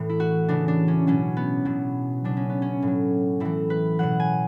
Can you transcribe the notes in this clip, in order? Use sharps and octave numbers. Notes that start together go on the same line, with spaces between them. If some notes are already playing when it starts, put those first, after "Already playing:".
Already playing: A2 E3
E4
F#4
C#3 E3 D4
D4
C#4
B2 F#3 C#4
B3
B2 F#3
C#3 F#3 D4
C#4
B3
C#4
A2 F#3
A2 E3 E4
B4
B2 F#3 F#5
G#5